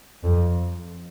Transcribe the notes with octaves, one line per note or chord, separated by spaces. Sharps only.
F2